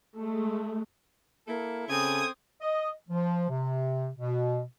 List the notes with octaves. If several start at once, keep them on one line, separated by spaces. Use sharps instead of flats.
G#3 A3
A#3 E4 A4
C#3 C4 A4 D#6 G#6
D#5
F3
C3
B2